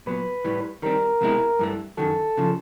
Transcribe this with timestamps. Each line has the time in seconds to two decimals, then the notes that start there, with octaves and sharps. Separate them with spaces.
0.06 A#2 F#3 B3 B4
0.45 A2 E3 G3
0.82 D#3 G3 C4 A#4
1.21 E2 B2 G#3 C4 E4
1.59 G2 E3 A3
1.97 F#2 D#3 F#3 A4
2.37 C#3 F3